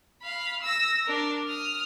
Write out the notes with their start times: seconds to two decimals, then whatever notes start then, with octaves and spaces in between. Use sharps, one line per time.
0.22 F5 B5
0.63 E6 A#6
1.07 D4 A#4
1.46 D#6 F6